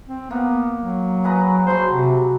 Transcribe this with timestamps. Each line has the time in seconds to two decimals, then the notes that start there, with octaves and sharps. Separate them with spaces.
0.07 C4
0.31 A#3 B3
0.81 F#3
1.24 G#4 B4 A#5
1.67 F3 F#3 C5
1.88 C3